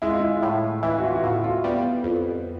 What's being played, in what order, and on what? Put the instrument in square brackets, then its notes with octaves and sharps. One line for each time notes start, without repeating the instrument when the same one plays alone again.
[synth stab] G#3 [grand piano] E4
[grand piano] F4
E4
[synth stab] A2
[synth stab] E3 [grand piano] E4
[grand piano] F#4
F4
F#4
[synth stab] A2 [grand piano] F4
[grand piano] F4
[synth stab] G3 [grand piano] B3
[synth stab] F2